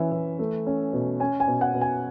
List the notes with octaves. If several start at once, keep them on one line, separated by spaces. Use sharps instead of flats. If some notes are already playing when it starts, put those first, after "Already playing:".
Already playing: E3 C#4 E5
E3
A3
C#4
B2
C#4 G#5
G#5
B2
F#5
B2
G#5